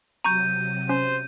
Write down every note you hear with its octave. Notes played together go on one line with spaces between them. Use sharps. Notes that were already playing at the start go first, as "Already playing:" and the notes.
C3 F#3 A#5 C#6 G6 D#7
C#4 C5